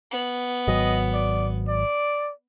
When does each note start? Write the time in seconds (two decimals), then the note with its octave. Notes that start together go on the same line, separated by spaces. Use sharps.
0.11 B3
0.68 G#1 F#3 D#5
1.14 D5
1.68 D5